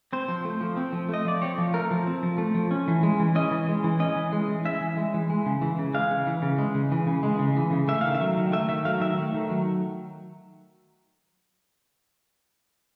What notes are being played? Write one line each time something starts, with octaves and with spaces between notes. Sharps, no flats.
C4 C5
F3
A3
F3
C4
F3
A3 D#5
F3 D5
C4 C#5
F3
A3 A#4
F3
C4
F3
A3
F3
C#4
E3
G#3
E3
C#4 D#5
E3
G#3
E3
C#4 D#5
E3
G#3
E3
C#4 E5
E3
G#3
E3
G#3
C#3
E3
C#3
G#3 F5
C#3
E3
C#3
G#3
C#3
E3
C#3
G#3
C#3
E3
C#3
A3 E5
D#3 F5
E5
F#3
D#3
A3 E5
D#3 E5
F#3 F5
D#3 E5
A3
D#3
F#3